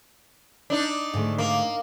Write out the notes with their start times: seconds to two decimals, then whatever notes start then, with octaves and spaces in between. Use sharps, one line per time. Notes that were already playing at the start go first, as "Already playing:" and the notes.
0.70 D4 D#4
1.14 G#2 D3 A3
1.38 A#3